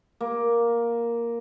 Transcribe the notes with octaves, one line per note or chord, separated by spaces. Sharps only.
A#3